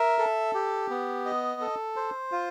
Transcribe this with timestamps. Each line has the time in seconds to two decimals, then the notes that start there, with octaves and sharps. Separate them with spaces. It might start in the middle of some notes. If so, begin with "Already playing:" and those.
Already playing: A#4 E5
0.19 A4
0.55 G4
0.90 B3
1.26 D#5
1.61 A4
1.96 C5
2.32 F4